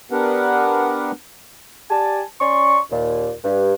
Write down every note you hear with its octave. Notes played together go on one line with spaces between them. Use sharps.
B3 D4 G4 A#4 B4 F#5
G4 D5 G#5 A5
C#4 D5 C6 C#6
D#2 A#2
G2